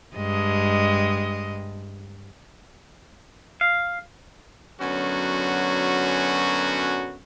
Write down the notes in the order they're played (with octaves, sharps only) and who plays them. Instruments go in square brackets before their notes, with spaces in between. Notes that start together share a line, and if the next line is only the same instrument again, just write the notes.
[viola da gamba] G2 G#3 D#5
[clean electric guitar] F5
[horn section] F#2 D3 F#3 B3 C#4 F#4